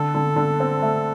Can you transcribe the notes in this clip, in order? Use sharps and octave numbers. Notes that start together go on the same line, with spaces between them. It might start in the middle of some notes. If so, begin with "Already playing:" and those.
Already playing: D3 A4
D3
D3
C4
A3